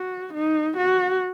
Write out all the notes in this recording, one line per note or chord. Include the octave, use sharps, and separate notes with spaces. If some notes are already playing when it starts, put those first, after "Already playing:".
Already playing: F#4
D#4
F#4